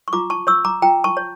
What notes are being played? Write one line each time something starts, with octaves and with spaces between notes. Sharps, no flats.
C#6
F4 A#5 D6
A5 C#6
C#5 C#6 E6
A#5 D6
F4 G5 A#5
A5 C#6
C#5